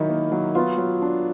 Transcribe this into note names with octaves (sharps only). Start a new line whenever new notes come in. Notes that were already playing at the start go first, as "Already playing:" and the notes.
Already playing: D#3 F#3 D#4 E4
A#3
F#3
B3 F4
F#3
D4